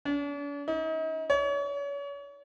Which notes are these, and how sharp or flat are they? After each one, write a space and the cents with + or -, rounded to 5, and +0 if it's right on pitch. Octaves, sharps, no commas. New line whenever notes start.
D4 -45
D#4 +40
C#5 +35